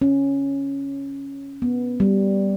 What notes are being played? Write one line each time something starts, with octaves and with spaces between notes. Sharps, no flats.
C#4
B3
G3